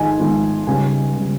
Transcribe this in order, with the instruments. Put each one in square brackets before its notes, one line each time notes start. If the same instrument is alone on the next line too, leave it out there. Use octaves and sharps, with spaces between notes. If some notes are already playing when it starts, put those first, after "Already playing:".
Already playing: [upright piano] G#1 G#2 F3 G#3 G#5
G#1 G#2 F3 G#3
C#2 C#3 G3 G#5
C#3 G3